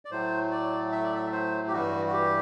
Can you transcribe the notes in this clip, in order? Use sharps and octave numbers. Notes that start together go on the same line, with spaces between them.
D5
A2 F#3 A3 C5
D5
E5
D5
E5
C5
G4
G2 E3 G3 F#4
F#4
G4